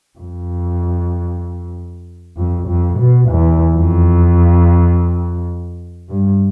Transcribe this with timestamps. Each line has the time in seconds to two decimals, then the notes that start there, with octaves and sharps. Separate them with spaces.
0.19 F2
2.37 F2
2.68 F2
2.98 B2
3.29 E2
3.76 F2
6.09 G2